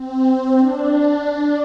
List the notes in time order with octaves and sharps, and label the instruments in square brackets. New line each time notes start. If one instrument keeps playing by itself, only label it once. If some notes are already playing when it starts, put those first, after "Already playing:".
Already playing: [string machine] C4
C4
D4